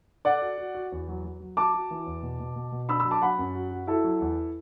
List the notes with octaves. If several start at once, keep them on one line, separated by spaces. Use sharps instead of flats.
A4 D5 F#5
F#4
F#4
F#4
E2
F#3
F#3
F#3
F#4 A5 D6
F#4
E3
E2
B2
B2
B2
B2
D4 B5 E6
B5 E6
F#3
A5 D6
F#3 F#5 B5
F#2
F#4
F#4
E4 F#4 A4
F#3
E2